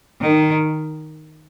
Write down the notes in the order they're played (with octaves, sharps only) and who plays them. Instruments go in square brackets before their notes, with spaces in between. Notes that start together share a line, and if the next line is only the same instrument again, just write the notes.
[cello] D#3